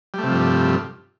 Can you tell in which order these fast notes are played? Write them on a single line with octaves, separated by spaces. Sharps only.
G3 A3 C3 F3 G2